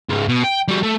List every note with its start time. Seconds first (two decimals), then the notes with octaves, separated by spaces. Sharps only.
0.09 C#2 G#2
0.28 B2
0.44 G5
0.68 G3 F#4
0.83 A3